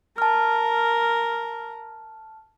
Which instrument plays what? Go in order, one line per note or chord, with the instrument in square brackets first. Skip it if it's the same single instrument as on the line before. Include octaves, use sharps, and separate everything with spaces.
[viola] A#4 [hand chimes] A5 F6